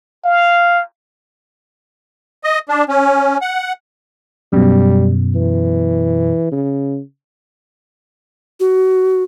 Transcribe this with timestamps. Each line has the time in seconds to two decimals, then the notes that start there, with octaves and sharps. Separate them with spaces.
0.24 F5
2.44 D#5
2.69 D4
2.89 C#4
3.41 F#5
4.53 F#2 B2 G3
5.35 E3
6.52 C#3
8.60 F#4